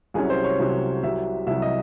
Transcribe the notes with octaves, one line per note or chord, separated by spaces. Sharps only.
C2 C3 F#3 C#4 G#4
C5
C#5
C2 C3 F#3 C#4
C2 C3 F#3 E5
C2 C3 F#3 E5
D#5